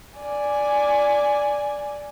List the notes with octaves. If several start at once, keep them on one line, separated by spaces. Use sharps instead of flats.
D5 G#5